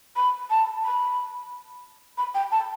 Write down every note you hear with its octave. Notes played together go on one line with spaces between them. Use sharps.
B5
A5
B5
B5
G5
A5